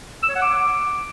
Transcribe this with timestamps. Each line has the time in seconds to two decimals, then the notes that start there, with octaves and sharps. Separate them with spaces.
0.23 E6
0.29 C#5
0.35 F#5
0.42 D6